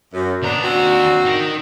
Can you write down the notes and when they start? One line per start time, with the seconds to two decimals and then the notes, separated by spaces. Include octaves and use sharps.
0.14 F#2
0.43 D#2 B3 D4 A#5
0.63 C4 D4 F#4
1.26 D#4 A#4